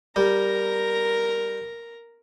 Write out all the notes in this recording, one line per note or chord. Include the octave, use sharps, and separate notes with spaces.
G3 A#4 A#5